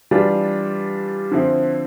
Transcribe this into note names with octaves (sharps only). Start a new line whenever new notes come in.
E3 G3 D4 F4
D3 F3 C4 E4